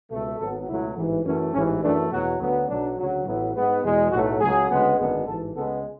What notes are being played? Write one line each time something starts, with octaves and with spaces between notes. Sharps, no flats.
C#2 B2 A3
G#1 G#2 F#3 B3 A4
C#2 B2 F#3 A3 E4
A1 G#2 E3
F#2 E3 A3 C#4
A1 G#2 E3 C#4
F#2 E3 A3 D4
E2 B2 F#3 F#4
D2 D3 F#3 B3
B1 B2 F#3 D4
D2 C#3 F#3
A1 A2 F#3 B3 E4
G#2 G#3 B3
E2 B2 G#3
B1 A2 F#3 A3 F#4
C#2 C#3 F#3 G#4
D2 C#3 G#3 B3
G#1 F#2 D3 G#3 B3
A1 G#2 E3 A4
C#2 C#3 G#3 B3 A4